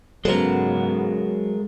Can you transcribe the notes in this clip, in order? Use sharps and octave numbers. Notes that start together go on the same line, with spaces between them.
G#2 C#3 F#3 G#3 B3 A4 A#4 C5